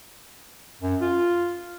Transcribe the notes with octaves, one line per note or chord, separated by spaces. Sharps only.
F#2
F4